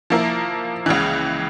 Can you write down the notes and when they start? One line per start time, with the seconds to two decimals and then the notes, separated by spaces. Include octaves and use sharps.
0.10 F3 A#3 E4 A#4
0.86 C#2 C#3 E3